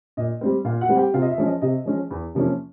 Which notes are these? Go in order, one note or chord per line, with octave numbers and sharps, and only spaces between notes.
A#2 D#5
G3 C4
A#2 F4 F5
F#4 F#5
G3 C4
G4 G5
C3 F4 F5
D#5
E5
F3 G#3 C#4
D#5
C3 D#5
F3 G#3 C#4
E2
C3 F3 A#3 C#4